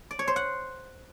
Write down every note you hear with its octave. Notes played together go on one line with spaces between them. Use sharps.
D5
C#5
C5
F#5